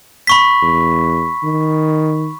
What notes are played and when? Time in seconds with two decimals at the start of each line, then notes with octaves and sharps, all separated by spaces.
0.27 B5 C#6 B6
0.62 E2
1.43 D#3